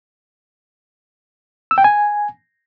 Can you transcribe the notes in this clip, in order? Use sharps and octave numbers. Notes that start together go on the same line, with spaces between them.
E6
G5
G#5